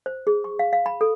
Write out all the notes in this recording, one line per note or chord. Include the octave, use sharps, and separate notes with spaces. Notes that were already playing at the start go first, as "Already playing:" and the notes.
C5
G#4
C#6
F5
F5
B5
A4